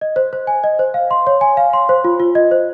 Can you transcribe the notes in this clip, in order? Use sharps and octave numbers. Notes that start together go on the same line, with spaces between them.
D#5
C5
C5
G#5
D#5
C5
F5
C6
C#5
G#5
F5
C6
C5
F4
F4
D#5
C5